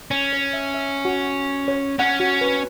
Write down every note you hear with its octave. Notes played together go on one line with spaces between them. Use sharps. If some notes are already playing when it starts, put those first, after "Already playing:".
C#4
C#5
E5
E5
F#4
C#5
C#4 F#5
F#4
B4